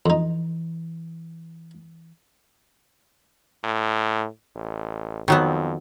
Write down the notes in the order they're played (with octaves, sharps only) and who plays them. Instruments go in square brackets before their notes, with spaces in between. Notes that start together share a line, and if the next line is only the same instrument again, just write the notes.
[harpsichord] F2 D#4 [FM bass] E3
[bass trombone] A2
A1
[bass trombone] F2 [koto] D#3 F#3 B3